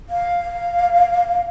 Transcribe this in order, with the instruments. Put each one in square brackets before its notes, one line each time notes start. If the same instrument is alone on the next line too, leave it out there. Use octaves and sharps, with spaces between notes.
[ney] F5